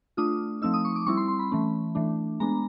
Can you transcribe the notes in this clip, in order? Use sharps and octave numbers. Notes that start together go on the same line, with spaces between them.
A3 D4 F4 D#6
F3 A3 C4 D#4 E6
D#6
C#6
D6
G3 C4 E4 C#6
C6
C6
B5
E3 A3 C#4
E3 A3 D4
G#3 B3 D4 A#5